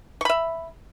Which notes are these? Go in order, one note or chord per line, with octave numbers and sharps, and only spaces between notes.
E5 B5 C#6